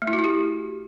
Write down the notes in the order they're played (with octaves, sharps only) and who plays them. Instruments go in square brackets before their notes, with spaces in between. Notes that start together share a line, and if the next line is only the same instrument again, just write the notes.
[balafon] A3
E4
F#4
E4
G4